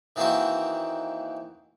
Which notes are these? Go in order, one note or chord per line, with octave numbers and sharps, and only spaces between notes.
D#3 E3 A#3 C4 F#4